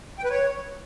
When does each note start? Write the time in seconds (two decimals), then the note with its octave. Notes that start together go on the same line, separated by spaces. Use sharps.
0.19 G5
0.24 B4
0.30 C#5